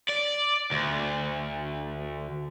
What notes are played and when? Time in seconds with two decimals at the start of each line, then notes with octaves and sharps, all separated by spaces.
0.09 D5
0.72 D2